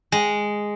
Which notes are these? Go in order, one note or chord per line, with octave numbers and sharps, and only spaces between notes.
G#3